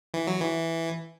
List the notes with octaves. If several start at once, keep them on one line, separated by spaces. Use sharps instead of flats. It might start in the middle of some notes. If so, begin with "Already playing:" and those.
E3
F#3
E3